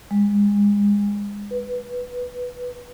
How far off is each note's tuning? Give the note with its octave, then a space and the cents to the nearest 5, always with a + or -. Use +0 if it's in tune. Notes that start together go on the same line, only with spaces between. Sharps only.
G#3 -30
B4 +0